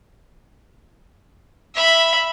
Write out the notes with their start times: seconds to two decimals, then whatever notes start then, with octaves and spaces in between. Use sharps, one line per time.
1.75 E5 B5